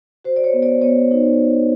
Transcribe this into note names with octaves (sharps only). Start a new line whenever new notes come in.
F#4 C5
D5
C#5
B3
D5
B3 C#5
D#4